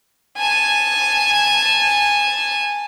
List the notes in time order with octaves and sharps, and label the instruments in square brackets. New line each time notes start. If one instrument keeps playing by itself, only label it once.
[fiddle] G#5 A5